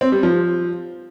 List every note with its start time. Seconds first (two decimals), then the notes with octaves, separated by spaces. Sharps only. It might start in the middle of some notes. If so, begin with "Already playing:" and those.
0.01 C4
0.12 G3
0.23 F3